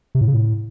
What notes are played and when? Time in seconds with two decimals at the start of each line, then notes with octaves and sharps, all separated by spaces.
0.15 C3
0.21 A2
0.27 C#3
0.34 A2